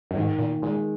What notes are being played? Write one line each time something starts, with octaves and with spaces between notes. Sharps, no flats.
F#2
G#2 D#3
A#2
A#2 G#3